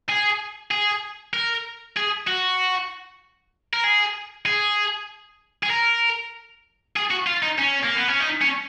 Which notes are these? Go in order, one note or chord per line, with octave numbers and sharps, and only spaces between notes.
G#4
G#4
A#4
G#4
F#4
A#4
G#4
G#4
G#4
A#4
G#4
F#4
F4
D#4
C#4
A#3
B3
C#4
D#4
C#4